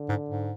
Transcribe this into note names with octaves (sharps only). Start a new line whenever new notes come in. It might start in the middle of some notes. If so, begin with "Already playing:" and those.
Already playing: D3
G#2
G#2